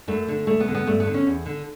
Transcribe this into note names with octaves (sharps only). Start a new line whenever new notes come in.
F#2 A3
D3
D2 A3
B3
D3
B3
G2 A3
B3
D3
C#4
E2
D3